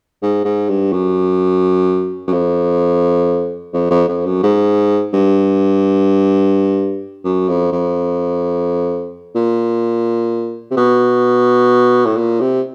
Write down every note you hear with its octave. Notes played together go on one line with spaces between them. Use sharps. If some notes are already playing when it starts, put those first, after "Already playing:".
G#2
G#2
G2
F#2
F#2
F2
F2
F2
F2
F#2
G#2
G2
F#2
F2
F2
A#2
C3
B2
A2
A#2
C3